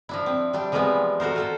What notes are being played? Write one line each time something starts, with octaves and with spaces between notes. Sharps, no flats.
F3 D4 E4
C4
G3 D4 G4
E3 F3 G3 G#3 B3 C4
F#4 A4 A#4 C5
F4 A4 C5